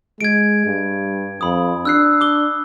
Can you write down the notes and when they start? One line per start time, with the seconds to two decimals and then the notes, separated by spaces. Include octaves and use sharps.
0.21 G#3 G#6 D7
0.66 G2
1.41 F2 B5 D#6
1.85 D4 E6 F#6 C7
2.21 D6 G7